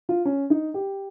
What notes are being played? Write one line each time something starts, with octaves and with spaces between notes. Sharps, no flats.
F4
C#4
D#4
G4